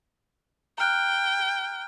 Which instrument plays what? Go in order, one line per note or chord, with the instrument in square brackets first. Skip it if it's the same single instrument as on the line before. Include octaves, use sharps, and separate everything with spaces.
[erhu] G5 [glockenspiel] A#5 F6 F#6